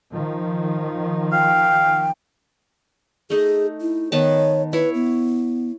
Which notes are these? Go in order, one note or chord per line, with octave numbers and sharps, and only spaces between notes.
D#3 F3
F5 G5
A3 D#4 G#4
E4
D#3 B3 C#5 A5
E4 B4 C#5
B3